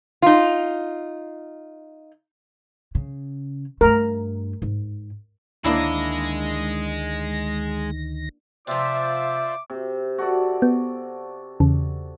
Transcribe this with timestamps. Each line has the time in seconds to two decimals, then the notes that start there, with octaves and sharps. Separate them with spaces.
0.22 D#4 F4
2.95 C#3
3.81 G2 A3 A#4
4.62 G#2
5.64 D2 D#3 G#3 A#3 D4 E4 D#5 A#6
8.67 C3 F3 F4 C5 D5 E5 D6
9.70 C3
10.18 F#4 A4 D5
10.62 B3
11.60 E2 C#3